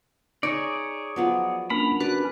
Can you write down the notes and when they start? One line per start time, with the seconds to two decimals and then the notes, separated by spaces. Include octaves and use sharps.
0.43 D#4 G#4 C#5 D5
1.16 F3 F#3 B3
1.70 A#3 C#4 D4 A#4 B5
2.01 F#4 B4 D5